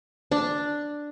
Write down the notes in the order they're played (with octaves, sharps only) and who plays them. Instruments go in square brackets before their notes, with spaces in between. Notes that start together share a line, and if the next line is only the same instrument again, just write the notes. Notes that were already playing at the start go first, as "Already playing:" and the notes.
[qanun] D4